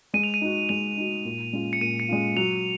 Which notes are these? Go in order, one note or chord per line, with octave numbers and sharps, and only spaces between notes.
G#3 D#7
F7
D#7
D#4 F#4
G#3 F7
D#4 F#4
A#2
G#3 C#4 F4
C#7
A#2 D#7
C#7
G#3 C#4 F4
F#3 F7